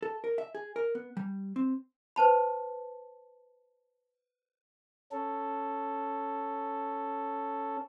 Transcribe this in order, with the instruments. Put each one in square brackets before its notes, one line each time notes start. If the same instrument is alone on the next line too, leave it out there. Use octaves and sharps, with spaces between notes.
[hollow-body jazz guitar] A4
A#4
E5
G#4
A#4
B3
G3
C4
[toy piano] B4 C5 A5 B5
[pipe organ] C#4 A4